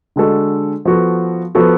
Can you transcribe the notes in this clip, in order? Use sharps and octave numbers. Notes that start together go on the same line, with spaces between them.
D3 G#3 D4 F#4 A4
F3 B3 F#4 A4
F3 B3 F#4 A4